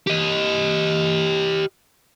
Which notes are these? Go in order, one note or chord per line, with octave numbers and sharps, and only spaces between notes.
G4 D#5